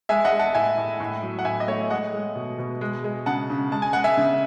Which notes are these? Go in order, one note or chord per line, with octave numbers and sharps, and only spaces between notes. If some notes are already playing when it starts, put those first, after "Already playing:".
G#3 E5 G#5
D#5 F#5
G#3
F#5 A5
A2 E5 G#5
A2
A2
F#3
F#5
A2 E5 G#5
D#5
A3 C#5 E5
G#3 D#5 F#5
G#3
B2
B2
G#3
G#3
C#3 F#5 A5
C#3
G#3 A5
G#5
G#3 F#5
E5 G#5
C#3